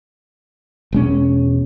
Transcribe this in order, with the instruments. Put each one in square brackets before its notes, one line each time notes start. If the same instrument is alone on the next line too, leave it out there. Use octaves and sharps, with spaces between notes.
[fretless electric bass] E1 G#3 C#4